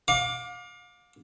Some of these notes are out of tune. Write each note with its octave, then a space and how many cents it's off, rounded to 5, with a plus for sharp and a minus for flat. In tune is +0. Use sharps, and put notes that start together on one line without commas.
F5 +35 D6 +0